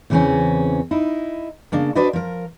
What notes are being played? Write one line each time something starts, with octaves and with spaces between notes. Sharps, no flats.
E2 C#3 E3 A#3 C4 C#4
D#4 E4
C#3 A#3 D4
D4 F#4 B4 C5 D5 D#5
F3 A#4